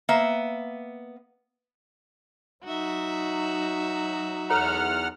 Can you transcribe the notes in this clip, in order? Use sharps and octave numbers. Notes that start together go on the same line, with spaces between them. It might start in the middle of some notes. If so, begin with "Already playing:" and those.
A#3 B3 E5
F#3 D#4 F#4 E5
E2 A4 C#5 F#5 A#5 F6